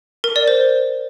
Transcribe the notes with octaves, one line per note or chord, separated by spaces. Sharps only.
A#4
D5
C5